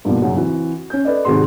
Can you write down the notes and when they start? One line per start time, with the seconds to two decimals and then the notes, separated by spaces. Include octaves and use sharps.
0.05 G2 B2 F3 A#3
0.22 F#2 C#3 F#3
0.37 E3 C4 F#4
0.90 C#4 G6
1.05 A4 B4 D5 D#5
1.25 G#2 C3 D#3 F#4 G#4 C6